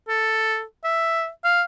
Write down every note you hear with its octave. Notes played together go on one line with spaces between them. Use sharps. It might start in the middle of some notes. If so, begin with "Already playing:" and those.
A4
E5
F5